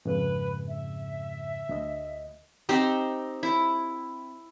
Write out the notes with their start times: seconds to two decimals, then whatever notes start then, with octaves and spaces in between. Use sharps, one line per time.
0.05 F2 G#2 C#3 B4
0.69 E5
1.69 D2 D#5
2.69 C4 D#4 G4 C5
3.43 E4